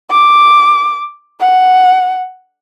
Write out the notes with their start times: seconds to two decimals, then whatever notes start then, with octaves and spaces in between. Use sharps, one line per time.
0.11 D6
1.40 F#5